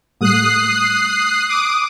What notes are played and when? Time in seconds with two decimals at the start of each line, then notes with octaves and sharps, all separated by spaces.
0.21 A2 G3 A3 D#6 F#6 C7
1.48 D6 D#6